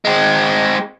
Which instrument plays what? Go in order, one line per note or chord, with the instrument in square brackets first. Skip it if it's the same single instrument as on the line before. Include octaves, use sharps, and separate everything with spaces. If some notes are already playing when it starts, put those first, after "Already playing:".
[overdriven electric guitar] G#3 C4